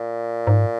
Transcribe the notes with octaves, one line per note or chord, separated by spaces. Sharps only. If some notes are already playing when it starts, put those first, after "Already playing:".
Already playing: A#2
G#2